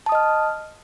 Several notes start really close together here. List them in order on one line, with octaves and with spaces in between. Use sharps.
A5 D#6 D#5 F6